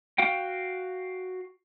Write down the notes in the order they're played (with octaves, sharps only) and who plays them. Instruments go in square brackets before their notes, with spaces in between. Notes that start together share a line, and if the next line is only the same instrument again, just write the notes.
[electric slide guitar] F#4 F5 G5